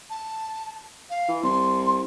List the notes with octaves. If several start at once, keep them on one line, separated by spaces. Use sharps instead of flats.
A5
F5
E3
C2 C6